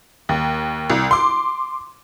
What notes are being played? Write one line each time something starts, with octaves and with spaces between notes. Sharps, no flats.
D#2
C2
C6 D6